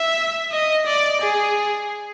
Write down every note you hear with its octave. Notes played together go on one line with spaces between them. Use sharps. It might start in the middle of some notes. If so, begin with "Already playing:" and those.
Already playing: E5
D#5
D5
G#4